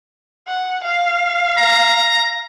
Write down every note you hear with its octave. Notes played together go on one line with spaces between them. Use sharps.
F#5
F5
A#5